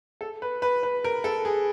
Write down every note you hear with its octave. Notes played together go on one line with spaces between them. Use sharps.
A4
B4
B4
B4
A#4
A4
G#4